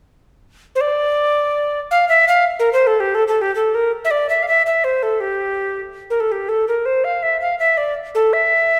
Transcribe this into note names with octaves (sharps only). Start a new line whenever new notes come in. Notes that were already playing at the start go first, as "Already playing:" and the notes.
C5
D5
F5
E5
F5
A#4
C5
A4
G4
A4
A4
G4
A4
A#4
E5
D5
E5
F5
E5
E5
C5
A4
G4
A#4
A4
G4
A4
A#4
C5
F5
E5
F5
E5
D5
A4
E5